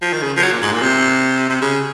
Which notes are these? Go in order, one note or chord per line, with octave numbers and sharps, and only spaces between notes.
F3
D#3
C#3
F3
F#3
A#2
G#2
A#2
C3
C3
C#3